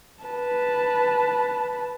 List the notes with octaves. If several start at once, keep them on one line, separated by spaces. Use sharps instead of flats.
B4 A5